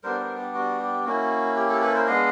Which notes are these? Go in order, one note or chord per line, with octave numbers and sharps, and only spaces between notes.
G3 B3 D4 A#4 C5
A#4 C5
G4
F#4
G4
A#3 C#4 E4 F#4
G4
G4 A4
A4 B4
A#4 C5
G#3 B3 D4 D#5 F5